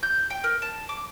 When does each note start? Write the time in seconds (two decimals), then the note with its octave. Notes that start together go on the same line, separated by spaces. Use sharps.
0.03 G6
0.30 G5
0.44 A#4
0.62 A5
0.89 D6